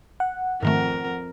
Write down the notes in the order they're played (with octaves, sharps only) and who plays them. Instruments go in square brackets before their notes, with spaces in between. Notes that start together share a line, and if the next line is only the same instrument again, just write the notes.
[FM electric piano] F#5
[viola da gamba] F2 A#4 [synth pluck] G#2 D#3 A3